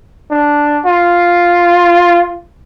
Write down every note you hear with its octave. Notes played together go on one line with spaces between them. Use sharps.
D4
F4